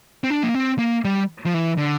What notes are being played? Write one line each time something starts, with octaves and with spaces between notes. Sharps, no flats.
C4
D4
A#3
C4
A#3
G3
F3
E3
D3